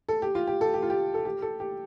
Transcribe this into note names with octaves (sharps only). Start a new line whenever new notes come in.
A4
G4
F4
G4
A4
G4
F4
G4
A4
G4
A4
G4